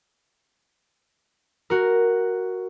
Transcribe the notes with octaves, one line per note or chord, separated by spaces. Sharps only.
F#4 A#4